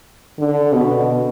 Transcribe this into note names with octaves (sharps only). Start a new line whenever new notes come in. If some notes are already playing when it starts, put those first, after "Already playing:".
D3
B2